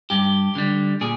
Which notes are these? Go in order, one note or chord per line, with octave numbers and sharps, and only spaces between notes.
G2 G4
D3 G3
A#2 G#4